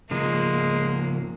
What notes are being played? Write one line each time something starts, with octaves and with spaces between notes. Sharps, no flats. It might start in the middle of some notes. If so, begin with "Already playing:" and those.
C#3 F3 G#3 A#3